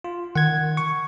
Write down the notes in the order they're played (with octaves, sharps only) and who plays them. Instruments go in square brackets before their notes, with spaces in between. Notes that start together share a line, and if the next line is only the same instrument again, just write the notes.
[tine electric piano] F4
[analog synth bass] D#3 [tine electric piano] F#5 G#6
[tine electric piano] C#6